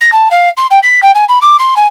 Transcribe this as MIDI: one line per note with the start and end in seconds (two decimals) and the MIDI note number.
0.01 0.10 94
0.12 0.28 81
0.31 0.49 77
0.57 0.66 84
0.71 0.79 79
0.83 1.00 95
1.03 1.11 79
1.15 1.25 80
1.29 1.38 83
1.42 1.56 86
1.59 1.74 84
1.76 1.87 80